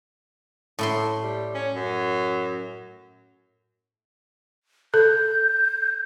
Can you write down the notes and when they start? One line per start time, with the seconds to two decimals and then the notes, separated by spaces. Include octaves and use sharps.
0.79 A2 E4 C6
1.23 G3
1.55 C#4
1.75 F#2
4.94 A4 G6